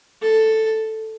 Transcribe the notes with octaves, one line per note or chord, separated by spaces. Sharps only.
A4